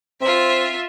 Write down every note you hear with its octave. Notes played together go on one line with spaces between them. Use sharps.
C4 F4 E5